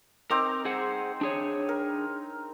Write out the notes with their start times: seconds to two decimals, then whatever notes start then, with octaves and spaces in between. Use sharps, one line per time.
0.30 C4 D#4 A#4 D6
0.65 G#4 C5 F#5
1.21 D4 G#4 C#5
1.69 A#4